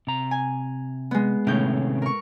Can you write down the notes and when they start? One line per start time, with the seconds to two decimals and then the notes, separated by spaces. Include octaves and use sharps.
0.07 C3 A#5
0.31 G#5
1.11 G#3 B3
1.47 A2 C3 D#3 C#4 G6
2.02 A#4 C#6